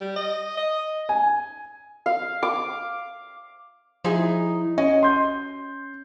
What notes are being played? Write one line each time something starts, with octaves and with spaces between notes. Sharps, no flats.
G3
D#5
D#5
G#5
F5
D6
F3 D#4 E4 G#4
C#4 F#4 D#5
C6 G6